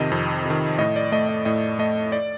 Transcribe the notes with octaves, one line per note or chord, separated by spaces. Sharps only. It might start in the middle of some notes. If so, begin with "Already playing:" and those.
Already playing: F2 C3 D#3 D#5
F2
C3 D#3
A2 D#5
D5
A3 D#5
D#5
A2 D#5
A3 D#5
D5